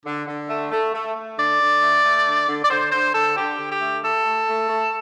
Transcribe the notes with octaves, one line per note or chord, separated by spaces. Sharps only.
D3
D3
A3
A3
A3
A3
D3 D5
D3
A3
A3
D3
D3
D5
D3 C5
D3 C5
D3 A4
D3 G4
D3
G4
A3
A3 A4
A3
A3
A3